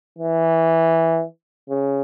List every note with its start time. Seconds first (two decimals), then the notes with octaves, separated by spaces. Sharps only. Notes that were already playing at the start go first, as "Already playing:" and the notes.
0.18 E3
1.70 C#3